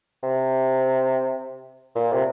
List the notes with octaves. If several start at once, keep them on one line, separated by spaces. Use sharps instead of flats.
C3
A#2
C3